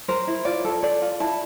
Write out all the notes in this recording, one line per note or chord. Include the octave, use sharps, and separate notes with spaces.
A#4 C5
E4
F4 D5
A4
A4 D5
F4
E4 A5